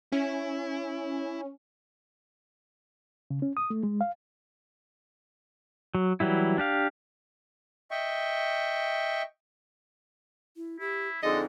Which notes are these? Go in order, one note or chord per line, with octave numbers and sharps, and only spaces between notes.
C#4 E4
C#3
C#4
D#6
A3
G#3
F5
F#3
E3 F#3 G3 E4
D4 G4 F5
D#5 E5 G5 C#6
E4
E4 G4
F2 D3 G#3 D#4 A4 D#5